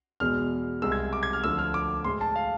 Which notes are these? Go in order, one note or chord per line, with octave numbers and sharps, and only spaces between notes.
E2 B2 G#3 F6
C2 C3 G#3 E6
G#6
D6
G#6
F6
D2 D3 F3 E6
F6
D6
A2 G#3 C6
A5
F5